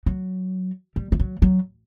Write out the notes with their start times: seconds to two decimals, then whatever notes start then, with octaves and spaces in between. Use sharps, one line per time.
0.06 F#3
0.96 G3
1.12 E3
1.19 F#3
1.42 F#3